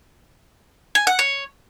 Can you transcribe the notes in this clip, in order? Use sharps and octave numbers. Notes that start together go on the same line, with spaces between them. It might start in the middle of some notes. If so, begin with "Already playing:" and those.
G#5
F#5
C#5